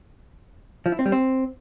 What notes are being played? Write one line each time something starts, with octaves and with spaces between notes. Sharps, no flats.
F3
E4
C4
G3
C4